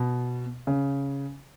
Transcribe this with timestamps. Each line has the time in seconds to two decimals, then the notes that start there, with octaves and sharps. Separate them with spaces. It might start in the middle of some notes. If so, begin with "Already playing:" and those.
Already playing: B2
0.67 C#3